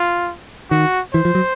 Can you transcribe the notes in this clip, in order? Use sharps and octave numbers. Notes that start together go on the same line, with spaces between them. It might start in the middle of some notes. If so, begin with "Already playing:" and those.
Already playing: F4
D#3 F#4
E3 C5
F3
F#3